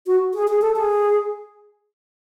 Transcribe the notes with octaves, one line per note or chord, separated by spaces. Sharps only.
F#4
G#4
G#4
A4
G#4